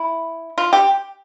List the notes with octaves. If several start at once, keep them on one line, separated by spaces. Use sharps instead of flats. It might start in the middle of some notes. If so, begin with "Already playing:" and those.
Already playing: E4
F4
G4